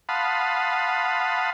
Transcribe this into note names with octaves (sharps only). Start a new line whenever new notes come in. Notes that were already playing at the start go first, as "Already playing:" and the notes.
F5 F#5 A5 B5 C6 D#6